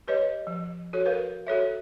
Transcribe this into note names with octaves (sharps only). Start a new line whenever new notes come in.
G4 B4 C#5 D#5
F3
F#4 A4 C#5
A#4 B4 F5
F#4 A4 C#5 E5